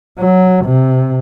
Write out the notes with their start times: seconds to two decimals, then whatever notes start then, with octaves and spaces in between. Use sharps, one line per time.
0.19 F#3
0.65 C3